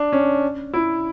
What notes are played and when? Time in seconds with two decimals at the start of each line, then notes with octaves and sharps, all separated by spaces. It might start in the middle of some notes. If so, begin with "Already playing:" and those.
Already playing: D4
0.13 C#4
0.74 E4